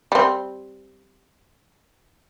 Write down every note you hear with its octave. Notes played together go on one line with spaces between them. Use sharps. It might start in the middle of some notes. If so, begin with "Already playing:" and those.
G3 C4